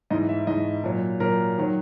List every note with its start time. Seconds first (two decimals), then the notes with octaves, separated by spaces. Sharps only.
0.10 G#2 E3 D#5
0.29 E5
0.47 G#2 E3 D#5
0.84 A#2 F#3
1.20 A#2 F#3 A#4
1.58 D#3 F#3